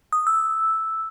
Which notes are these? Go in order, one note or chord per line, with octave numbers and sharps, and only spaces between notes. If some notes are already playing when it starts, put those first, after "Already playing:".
D#6
E6